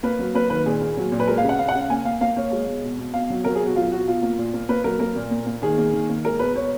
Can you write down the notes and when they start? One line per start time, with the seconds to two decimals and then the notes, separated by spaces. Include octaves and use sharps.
0.03 A#3 B4
0.19 F#3
0.35 A#3 B4
0.50 D#3 B4
0.66 A#2 G#4
0.81 A#3
0.97 F#3
1.12 A#2
1.20 B4
1.27 G#3 A#4
1.38 F5
1.43 C#3
1.49 F#5
1.59 C#3 F5
1.69 F#5
1.75 C#3
1.80 F5
1.90 A#3 G#5
2.05 A#3 F5
2.21 A#3 F5
2.36 A#3 C#5
2.51 G#3
2.67 B2
2.84 B2
2.98 B2
3.14 B2 F5
3.30 F#3
3.44 F#3 A#4
3.55 G#4
3.61 B2 F#4
3.76 F#3 F4
3.92 B2 F#4
4.08 B2 F4
4.23 A#3
4.38 A#2
4.53 A#3
4.69 A#3 B4
4.84 F#3 A#4
5.00 A#3 A#4
5.16 A#2
5.31 A#2
5.46 A#3
5.62 D#3 G#4
5.78 A#3
5.93 D#3
6.09 A#3
6.24 G#3 A#4
6.39 B2 B4
6.56 B2 C#5